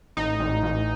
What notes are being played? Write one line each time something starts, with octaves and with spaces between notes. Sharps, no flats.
A1 D#4
A1
A1